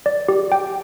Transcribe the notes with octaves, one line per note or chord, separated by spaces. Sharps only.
D5
G4
G5